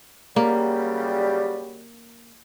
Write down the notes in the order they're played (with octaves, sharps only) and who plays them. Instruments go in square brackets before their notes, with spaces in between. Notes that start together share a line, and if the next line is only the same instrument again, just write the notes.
[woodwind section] C#3 F#3 G3 [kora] A#3